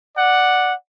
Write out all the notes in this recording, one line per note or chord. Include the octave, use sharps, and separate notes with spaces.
D5 F#5